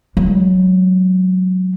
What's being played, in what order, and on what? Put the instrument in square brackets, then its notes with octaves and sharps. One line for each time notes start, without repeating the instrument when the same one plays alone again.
[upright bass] F#3 G#3